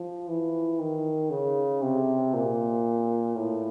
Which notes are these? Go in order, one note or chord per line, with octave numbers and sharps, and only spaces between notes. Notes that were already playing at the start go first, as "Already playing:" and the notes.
Already playing: F3
E3
D#3
C#3
C3
A#2
A2